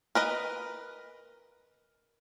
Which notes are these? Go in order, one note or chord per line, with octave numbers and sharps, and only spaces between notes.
A#4 B4 D#5